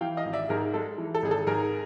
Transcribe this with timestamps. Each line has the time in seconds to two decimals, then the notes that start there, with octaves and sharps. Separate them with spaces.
0.01 E3 F5 G5
0.17 D#5 F5
0.25 G#1
0.33 D5 E5
0.49 G#2 G#4 A#4
0.74 G#3 A4
0.98 E3
1.15 A4
1.23 G#1 G#4
1.31 A4
1.47 G#2 G#4 A#4